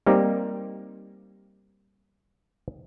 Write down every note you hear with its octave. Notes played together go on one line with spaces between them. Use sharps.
G3 A#3 C4 D#4 G4